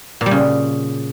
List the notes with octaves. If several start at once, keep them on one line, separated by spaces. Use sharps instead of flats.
A#2
G3
C#3